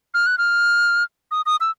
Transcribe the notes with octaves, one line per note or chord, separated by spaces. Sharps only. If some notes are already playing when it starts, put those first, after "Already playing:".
F6
F#6
F6
D#6
D#6
E6